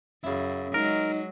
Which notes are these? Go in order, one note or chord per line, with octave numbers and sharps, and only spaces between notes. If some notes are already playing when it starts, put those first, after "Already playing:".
F#2 C#3 E4
F#3 G#3 D#4 A#4